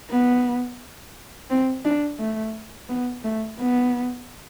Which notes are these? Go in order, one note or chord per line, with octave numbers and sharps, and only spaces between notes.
B3
C4
D4
A3
B3
A3
B3